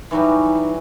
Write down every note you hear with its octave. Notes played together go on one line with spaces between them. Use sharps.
E3 F#3 G3 D#4